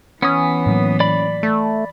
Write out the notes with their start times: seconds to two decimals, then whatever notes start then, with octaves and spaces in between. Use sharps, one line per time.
0.22 E3 B3 C#4 D#6
0.66 A2 F#3 A#3
1.00 D5 B5
1.43 A3